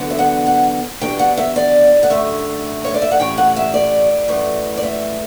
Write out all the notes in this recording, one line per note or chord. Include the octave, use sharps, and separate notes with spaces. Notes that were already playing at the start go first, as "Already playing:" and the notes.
Already playing: E2 D3 F#3 B3
E5
F#5
F#5
E2 B2 G3 D4 G5
F#5
E5
D5
F#5
F#2 D3 A3 E5
C#5
D5
E5
F#5
A2 E3 G3 C#4 G5
F#5
E5
D5
F#2 E3 A3
D5
E5